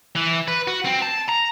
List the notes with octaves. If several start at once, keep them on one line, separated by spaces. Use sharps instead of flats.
E3
B4
F#4
C4
A5
A#5